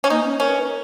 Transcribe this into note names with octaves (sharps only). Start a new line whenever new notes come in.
C#4
A#3 D#4
C#4
C#4 A#4
B4
A#4